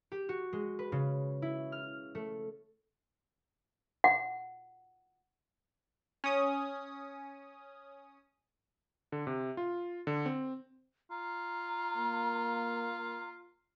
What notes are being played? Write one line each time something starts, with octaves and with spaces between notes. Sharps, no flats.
G4
F#4
G#3
B4
C#3
E4
F6
A3
F#5
C#4 D#6
D3
C3
F4
D3
C4
F4 A#5
A#3